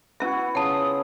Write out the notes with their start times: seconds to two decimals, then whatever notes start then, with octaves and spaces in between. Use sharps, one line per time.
0.20 B3 C#4 E4 F#4 E5 F#5
0.55 C#3 F4 F#5 A5 D#6